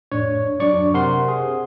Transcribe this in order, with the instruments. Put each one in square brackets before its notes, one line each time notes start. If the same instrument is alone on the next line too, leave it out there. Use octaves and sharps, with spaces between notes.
[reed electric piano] F2 A2 D4 [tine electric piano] C#5
[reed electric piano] F#2 F#3 [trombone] D4 [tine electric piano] D5 C#6
[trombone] C3 [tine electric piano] A#4 C6 [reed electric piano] F#5
[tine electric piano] G#4